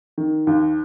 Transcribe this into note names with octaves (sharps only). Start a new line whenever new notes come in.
D#3
D#2